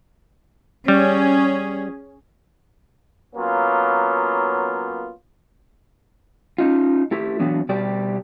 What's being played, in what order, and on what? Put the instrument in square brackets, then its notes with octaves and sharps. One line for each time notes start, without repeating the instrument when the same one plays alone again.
[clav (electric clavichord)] G3 [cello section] C#4 G#4
[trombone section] F#3 A#3 B3 C#4 F4
[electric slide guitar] C#4 D#4 F4
A3 E4 G4
E3 F#3 B3 D4
B2 G3 G4 D5